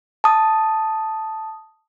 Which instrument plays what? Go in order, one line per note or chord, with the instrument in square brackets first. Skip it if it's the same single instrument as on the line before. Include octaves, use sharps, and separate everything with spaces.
[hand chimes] A5 D#6